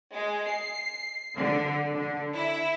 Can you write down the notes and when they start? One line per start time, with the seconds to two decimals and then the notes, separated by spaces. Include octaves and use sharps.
0.14 G#3
0.49 C7
1.36 D3
1.92 D3
2.34 E4